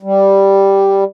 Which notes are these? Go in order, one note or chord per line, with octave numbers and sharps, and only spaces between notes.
G3